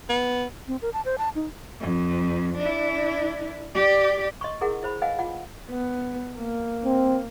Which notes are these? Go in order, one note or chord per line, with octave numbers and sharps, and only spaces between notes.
B3
C4
A#4
A5
C5
A5
D#4
F2
D4 E4
G4 D5
D#5 C6 C#6
E4 G#4 A#4 F#5
E4 C5 B5
B4 D#5 F5 F#5 G#5
F4 F#5
B3
A#3
C4